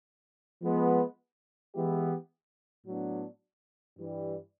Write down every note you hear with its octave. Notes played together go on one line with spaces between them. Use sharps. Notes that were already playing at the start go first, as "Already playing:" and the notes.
F3 G#3 B3
E3 G#3 B3 E4 G4
A2 F#3 B3 D4
G2 E3 G3